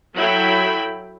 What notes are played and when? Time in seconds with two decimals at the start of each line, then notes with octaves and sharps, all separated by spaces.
0.16 F#3 E4 A4 E5 G5 B5